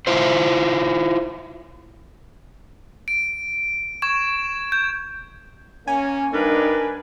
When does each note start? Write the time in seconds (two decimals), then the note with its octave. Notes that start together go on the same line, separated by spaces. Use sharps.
0.07 E4 F4 C5
3.08 D7
4.02 C#6 G#6 E7
4.72 G6
5.87 A#3 C#4 G#5
6.33 G2 D4 D#4 A#4 B4